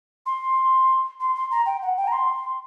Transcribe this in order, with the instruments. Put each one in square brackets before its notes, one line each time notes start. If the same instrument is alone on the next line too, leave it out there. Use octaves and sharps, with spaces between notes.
[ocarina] C6
C6
C6
A#5
G5
F#5
G5
A#5
C6